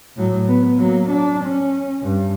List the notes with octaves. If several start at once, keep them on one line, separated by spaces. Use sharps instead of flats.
A2 F#3
B3
F#3 A#3
D4
C#4
G2